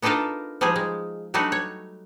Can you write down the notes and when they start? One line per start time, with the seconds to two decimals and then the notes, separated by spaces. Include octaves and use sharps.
0.02 B3 D4 D#4 F4 A4 A#4
0.61 F3 G3 G#3 D#4 G#4
0.76 G#3
1.34 F#3 G3 A3 D4 D#4 F#4
1.52 C#5